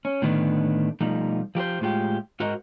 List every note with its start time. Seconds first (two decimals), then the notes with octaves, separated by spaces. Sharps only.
0.05 C#4
0.22 A2 D3 D#3 B3 D4
1.01 B2 F3 G3 A3 D#4
1.55 F3 G4 B4 C5
1.81 A2 G#3 F4 G4
2.40 G#2 F#4 A#4 C5 D#5